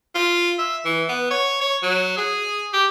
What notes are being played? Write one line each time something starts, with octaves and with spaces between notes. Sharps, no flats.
F4
E5
E3
B3
C#5
C#5
F#3
G#4
G4